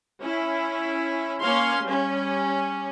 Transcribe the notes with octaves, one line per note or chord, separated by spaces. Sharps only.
C#4 E4
A#3 C#4 C#5 F5 C6
G3 C#4